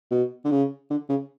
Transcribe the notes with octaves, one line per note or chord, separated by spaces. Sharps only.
B2
D3
C#3
D3
C#3